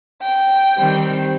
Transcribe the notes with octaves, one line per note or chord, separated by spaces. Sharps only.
G5
D#3 G3 C4